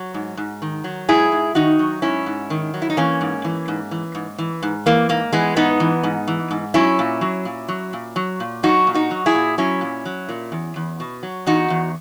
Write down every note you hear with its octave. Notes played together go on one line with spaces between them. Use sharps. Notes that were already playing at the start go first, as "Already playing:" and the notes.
Already playing: F#3
G#2
G#2
D#3
F#3
G#2 E4 G#4
G#2
D#3 D#4 F#4
F#3
G#2 C#4 E4
G#2
D#3
F#3
E4
D#4
E3 A#3 C#4
G#2
E3
G#2
E3
G#2
E3
G#2
E3 A#3
G#2 A#3
E3 G#3 B3
G#2 B3 D#4
E3
G#2
E3
G#2
F#3 C#4 E4
A#2
F#3
A#2
F#3
A#2
F#3
A#2
F#3 D#4 F#4
A#2
D#4 F#4
F#3
E4 G#4
A#2
F#3 C#4 E4
A#2
F#3
A#2
E2
E2
B2
F#3
E2 D#4 F#4
E2